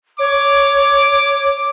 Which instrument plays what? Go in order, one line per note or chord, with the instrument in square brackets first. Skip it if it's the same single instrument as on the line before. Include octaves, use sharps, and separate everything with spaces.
[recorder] C#5 [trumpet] D6